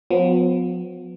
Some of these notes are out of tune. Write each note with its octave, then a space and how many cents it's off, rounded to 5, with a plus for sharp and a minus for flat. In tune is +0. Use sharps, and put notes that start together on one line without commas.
F3 +45 B3 +25